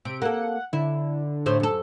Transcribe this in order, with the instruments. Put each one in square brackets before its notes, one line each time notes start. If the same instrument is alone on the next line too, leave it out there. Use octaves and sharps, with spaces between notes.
[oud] C3 [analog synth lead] D7
[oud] A#3 A4 [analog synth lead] F#5
[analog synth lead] D3 [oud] E4
[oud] A2 A3 C5
F#2 A4